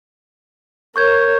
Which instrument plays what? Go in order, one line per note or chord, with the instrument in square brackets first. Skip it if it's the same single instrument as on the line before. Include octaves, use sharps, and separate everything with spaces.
[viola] A#4 C#5 [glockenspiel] C#6 G6 G#6